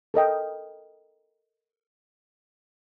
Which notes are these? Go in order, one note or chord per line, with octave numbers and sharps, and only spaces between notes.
A4 A#4 D#5 G5